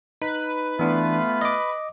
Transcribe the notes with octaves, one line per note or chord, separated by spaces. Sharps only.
D#4 B4
E3 A3 B3 D4 F4
D#5 D6